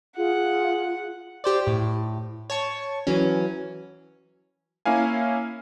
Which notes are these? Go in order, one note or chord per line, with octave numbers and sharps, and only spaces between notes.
F4 G#4 F#5
G4 C5 D5
A2
C#5 A5 C#6
E3 F#3 C#4
A#3 C#4 E4 F5 G#5